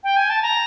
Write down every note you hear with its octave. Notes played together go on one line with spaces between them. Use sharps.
G5
G#5
A5
A#5